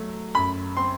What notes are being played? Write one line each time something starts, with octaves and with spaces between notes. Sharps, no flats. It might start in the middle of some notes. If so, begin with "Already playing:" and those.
Already playing: F#3 A3
F#2 B5
C4 C6